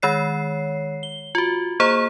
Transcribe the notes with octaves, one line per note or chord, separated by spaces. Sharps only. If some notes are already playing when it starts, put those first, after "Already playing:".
D#3 G#3 C#5 C7
G7
F4 F#4
A#3 G#4 C5 A#5